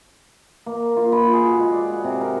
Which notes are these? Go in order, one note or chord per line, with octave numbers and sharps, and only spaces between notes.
A#3
F4
B5
G#4
F#4
G#3
D5
F#5
C3
A#4